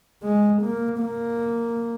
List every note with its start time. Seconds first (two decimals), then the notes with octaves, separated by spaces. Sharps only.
0.23 G#3
0.62 A#3
1.00 A#3